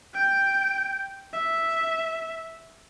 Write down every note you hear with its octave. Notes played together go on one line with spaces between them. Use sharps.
G5
E5